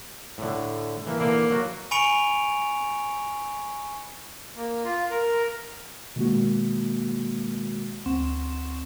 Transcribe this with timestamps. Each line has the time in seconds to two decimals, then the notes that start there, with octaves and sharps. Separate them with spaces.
0.38 A2 D3
1.06 E3 A#3
1.20 D3 E3 A#3 F5
1.51 F#3 F#4
1.91 G#5 B5 C#6 C#7 D7 F7
4.57 A#3
4.85 F4
5.11 A#4
6.16 B2 D#3 G#3 A#3 F#4
8.06 D2 C4 F#5 C6 C#6 E7